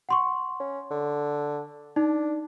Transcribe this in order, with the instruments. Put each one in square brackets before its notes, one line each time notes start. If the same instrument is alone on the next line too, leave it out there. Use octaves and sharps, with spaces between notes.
[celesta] F#5 C6 C#6
[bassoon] C#4
D3
[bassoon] D4 [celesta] D#4